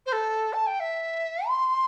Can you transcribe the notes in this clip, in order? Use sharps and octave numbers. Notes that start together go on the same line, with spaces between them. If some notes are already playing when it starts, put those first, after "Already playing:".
C5
A4
A5
G5
E5
C6